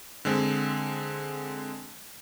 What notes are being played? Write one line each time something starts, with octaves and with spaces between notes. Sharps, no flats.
D3 G#3 C4